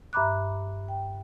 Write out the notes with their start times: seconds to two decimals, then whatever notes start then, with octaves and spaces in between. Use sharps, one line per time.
0.13 G2 E5 A#5 B5 D6 F#6
0.88 G5